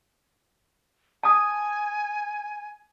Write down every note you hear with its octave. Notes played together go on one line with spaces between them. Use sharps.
G#5 A5 D#6